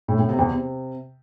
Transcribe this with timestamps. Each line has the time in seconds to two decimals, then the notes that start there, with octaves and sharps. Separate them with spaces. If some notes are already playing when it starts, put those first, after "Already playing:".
0.08 A2
0.19 A2
0.29 C3
0.39 E2
0.49 C3